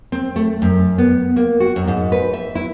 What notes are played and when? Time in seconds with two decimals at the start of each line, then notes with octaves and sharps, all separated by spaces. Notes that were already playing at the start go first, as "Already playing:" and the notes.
0.12 C4
0.36 A3
0.62 F#2
0.98 B3
1.36 A#3
1.60 F#4
1.76 F#2
1.87 G#2
2.12 B4
2.33 E5
2.55 E4